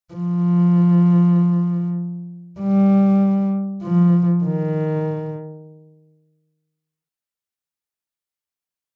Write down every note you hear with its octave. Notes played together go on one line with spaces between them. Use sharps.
F3
G3
F3
D#3